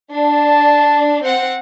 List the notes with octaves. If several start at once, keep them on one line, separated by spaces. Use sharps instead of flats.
D4 A5
C4 F#5